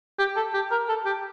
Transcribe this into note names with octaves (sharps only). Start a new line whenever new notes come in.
G4
A4
G4
A#4
A4
G4